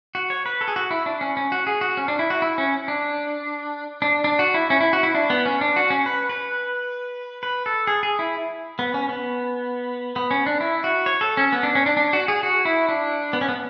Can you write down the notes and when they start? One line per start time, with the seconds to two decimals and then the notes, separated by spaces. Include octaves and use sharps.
0.15 F#4
0.30 C#5
0.46 B4
0.61 A4
0.68 G#4
0.76 F#4
0.91 E4
1.06 D4
1.21 C#4
1.37 C#4
1.52 F#4
1.67 G#4
1.81 F#4
1.97 C#4
2.08 D4
2.19 E4
2.30 F#4
2.42 E4
2.58 C#4
2.88 D4
4.02 D4
4.24 D4
4.39 F#4
4.54 E4
4.70 C#4
4.80 E4
4.93 F#4
5.03 E4
5.15 D4
5.30 B3
5.46 C#4
5.61 D4
5.76 F#4
5.90 C#4
6.06 B4
6.29 B4
7.43 B4
7.66 A4
7.87 G#4
8.03 G#4
8.19 E4
8.79 B3
8.94 C#4
9.09 B3
10.16 B3
10.31 C#4
10.46 D4
10.60 E4
10.84 F#4
11.06 C#5
11.21 A4
11.37 C#4
11.53 B3
11.63 D4
11.75 C#4
11.86 D4
11.97 D4
12.13 F#4
12.28 G#4
12.43 F#4
12.65 E4
12.89 D4
13.33 B3
13.41 C#4
13.49 B3